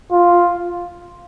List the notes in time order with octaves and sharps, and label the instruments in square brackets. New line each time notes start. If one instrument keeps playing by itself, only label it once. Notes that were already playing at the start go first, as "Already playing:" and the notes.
[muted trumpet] F4